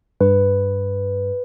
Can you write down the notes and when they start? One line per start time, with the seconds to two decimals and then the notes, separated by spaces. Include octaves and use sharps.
0.21 G2 B4